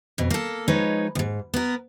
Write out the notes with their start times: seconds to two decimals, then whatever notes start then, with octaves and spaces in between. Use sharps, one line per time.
0.18 F2 B2
0.30 A#3 A4
0.68 F3 G#3 D#4 B4 C#5
1.15 D2 G#2
1.54 B3 A#4